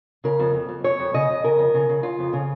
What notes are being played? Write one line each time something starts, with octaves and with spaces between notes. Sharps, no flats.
C#3 A#4
F2
F2
F2
F2 C#5
F2
C#3 D#5
F2
C#3 A#4
F2
C#3
C#3
C#3 F4
F2
C#3